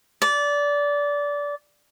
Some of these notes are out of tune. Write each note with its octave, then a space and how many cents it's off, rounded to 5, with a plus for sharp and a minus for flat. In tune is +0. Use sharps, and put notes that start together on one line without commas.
D5 -20